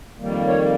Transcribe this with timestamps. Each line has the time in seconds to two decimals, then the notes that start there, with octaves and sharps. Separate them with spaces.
0.17 F2 D#3 G3 A#3
0.47 C#5